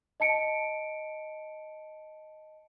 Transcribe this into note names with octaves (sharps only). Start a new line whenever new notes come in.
D#5 A5 C#7 D7